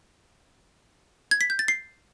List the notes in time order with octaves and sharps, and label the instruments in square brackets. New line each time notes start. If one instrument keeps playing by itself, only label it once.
[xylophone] G#6
B6
G6
A6
C7